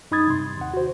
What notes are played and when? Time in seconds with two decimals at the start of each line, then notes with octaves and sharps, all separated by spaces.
0.11 F#2 D#4 B5 D#6 G#6 A6
0.28 G2 C3 C6
0.57 D#2 F#5
0.74 F#4 C5